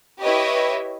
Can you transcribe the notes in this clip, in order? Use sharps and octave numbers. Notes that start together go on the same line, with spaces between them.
E4 G4 B4 C#5 D#5 E5